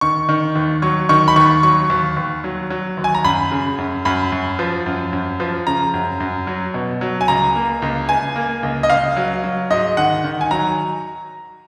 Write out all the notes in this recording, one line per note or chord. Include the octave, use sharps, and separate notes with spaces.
D#3 C#6
D#3
D#2
F#3 C#6
D#3 C#6
B5
D#2 C#6
F#3 C#6
D#2
D#2
F#3
F#3
D#2
G#5
A#5
F#2 B5
C#3
F#2
F#2 B5
F#2
F3
F#2
F#2
F3
C#3 A#5
F#2
F#2
F#3
B2
F#3
G#5
C#2 A#5
A#3
C#2
C#2 G#5
A#3
C#2
D#5
C#2 F5
F#3
F#3
G#2 D#5
D#3 F#5
D#3
G#5
F#3 A#5